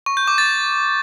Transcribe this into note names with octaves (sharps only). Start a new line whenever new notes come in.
C#6
G6
D6
A6